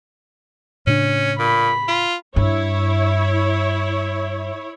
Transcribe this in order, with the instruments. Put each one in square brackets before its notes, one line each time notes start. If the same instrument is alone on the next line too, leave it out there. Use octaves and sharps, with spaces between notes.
[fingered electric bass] A2 C#3 D4 [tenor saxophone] C#4
[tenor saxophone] A#2 [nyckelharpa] B5
[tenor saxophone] F4
[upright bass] G2 [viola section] E4 C#5